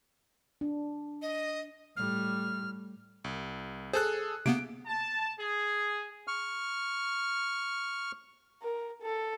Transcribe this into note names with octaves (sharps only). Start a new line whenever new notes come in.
D4
D#5
A2 G3 F6
C2
G#4 A4 C5 F#6
C3 A#3 B3 D7
A5
G#4
C#6 F6
A#4
A4